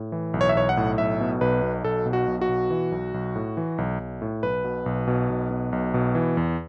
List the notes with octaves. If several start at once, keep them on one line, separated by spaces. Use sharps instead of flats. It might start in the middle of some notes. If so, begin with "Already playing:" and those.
Already playing: A2
E3
B1
C#5
E5
B1 C#5
F#5
A2
B1 E5
B2
B1 B4
B2
B1 A4
B2
F#4
B1
F#4
B2
E3
B1
B1
A2
E3
B1
B1
A2
B1 B4
B2
B1
B2
B1
B2
B1
B2
E3
E2